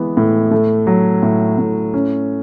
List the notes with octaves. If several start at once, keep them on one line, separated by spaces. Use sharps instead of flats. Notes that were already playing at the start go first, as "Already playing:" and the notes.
Already playing: E3 G#3 B3
A2
A3
F#3
A2
A2
C#4